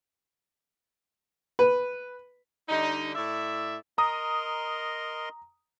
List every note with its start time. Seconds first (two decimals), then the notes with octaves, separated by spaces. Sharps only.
1.59 B4
2.69 D3 G3 D#4
3.15 A2 D5 E5
3.98 A#4 D#5 A#5 C6 D#6